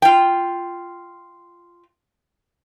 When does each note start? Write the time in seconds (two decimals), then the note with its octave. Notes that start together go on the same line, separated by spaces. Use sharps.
0.02 F4 G5